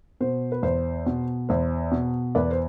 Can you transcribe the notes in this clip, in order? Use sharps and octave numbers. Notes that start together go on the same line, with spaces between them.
B2 C5
B4
E2 C5
B2
E2 C5
B2
E2 B4 D5
C5